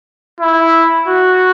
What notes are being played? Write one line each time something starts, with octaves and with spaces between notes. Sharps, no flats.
E4
F#4